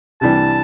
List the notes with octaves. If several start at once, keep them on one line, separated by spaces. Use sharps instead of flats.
C2 C3 E3 G3 D4 A5